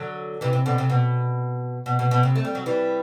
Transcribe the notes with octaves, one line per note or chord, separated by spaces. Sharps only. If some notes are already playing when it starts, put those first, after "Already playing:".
Already playing: D3 F#3
C3 E3
C3
B2 D3
C3
B2
B2
B2
B2
C3
A3
G3
F#3
E3 G3